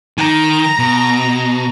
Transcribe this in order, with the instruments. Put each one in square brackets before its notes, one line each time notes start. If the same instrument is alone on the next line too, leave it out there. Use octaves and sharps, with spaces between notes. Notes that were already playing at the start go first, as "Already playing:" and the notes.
[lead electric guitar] D#3 [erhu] A#5
[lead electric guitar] B2